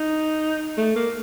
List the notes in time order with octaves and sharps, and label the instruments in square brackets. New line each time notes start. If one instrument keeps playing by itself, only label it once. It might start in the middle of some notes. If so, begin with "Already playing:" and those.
Already playing: [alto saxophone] D#4
A3
A#3